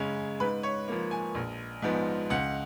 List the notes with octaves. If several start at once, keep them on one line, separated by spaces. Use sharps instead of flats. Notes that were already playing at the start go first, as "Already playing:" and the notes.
Already playing: F#2 C#3 G#3 C#4
G#2 B4
C#5
F3 A#3
G#5
A#1
G#2 F3 B3
C#2 F#5